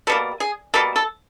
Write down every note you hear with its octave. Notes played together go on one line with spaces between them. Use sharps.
B2 G3 A#3 A4
G#4
B2 G3 A#3 A4
A4